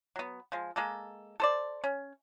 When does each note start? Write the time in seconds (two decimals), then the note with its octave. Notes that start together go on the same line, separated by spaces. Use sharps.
0.16 F#3 B3
0.52 F3 G#3
0.76 G#3 A#3 A4
1.40 A4 C5 D5
1.84 C#4